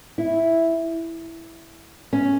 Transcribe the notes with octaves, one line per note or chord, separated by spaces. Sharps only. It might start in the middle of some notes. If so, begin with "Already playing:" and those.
E4
C#4